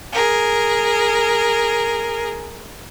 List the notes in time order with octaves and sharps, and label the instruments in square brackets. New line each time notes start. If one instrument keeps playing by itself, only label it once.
[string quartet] G#4 A#4